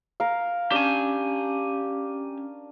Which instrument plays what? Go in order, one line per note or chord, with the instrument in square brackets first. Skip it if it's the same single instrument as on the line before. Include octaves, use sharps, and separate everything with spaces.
[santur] A#4 F5
[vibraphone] C#4 [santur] D4 [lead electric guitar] G4 G#5